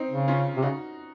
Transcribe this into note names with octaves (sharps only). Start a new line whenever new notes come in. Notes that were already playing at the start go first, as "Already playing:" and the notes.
Already playing: C4 D#4
C#3
C#4 F4
C3
C#3 D#4 F#4